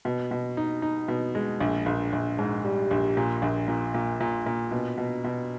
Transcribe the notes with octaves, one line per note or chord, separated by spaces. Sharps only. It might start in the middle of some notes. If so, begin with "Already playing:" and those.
B2
B2
D#4
D#4
B2
G#3
A#1
A#1
A#1
G#2
G3
A#1
A#2
A#1
A#2
A#2
A#2
A#2
B2
B2
B2